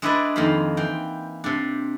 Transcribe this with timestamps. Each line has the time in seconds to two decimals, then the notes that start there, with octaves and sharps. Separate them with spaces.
0.02 G#3 D4 E4 G#4 B4 D5
0.36 F2 D#3 A#3 C5 B5
0.77 E3 G5
1.44 C3 D4